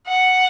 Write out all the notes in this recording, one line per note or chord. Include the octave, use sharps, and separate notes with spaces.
F#5